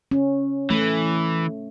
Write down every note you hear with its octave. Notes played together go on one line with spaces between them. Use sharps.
C#4
E3 A3